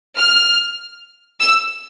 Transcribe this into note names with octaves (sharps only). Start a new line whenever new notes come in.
F6
E6